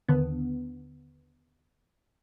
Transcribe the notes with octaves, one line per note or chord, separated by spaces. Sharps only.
D#2 D3 B3